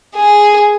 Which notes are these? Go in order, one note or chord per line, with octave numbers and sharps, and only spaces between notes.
G#4